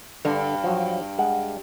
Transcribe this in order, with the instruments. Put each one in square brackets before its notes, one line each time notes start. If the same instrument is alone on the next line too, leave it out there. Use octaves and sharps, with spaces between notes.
[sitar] G2 [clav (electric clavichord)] D3
[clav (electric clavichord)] F3 F#3
G#3 F#5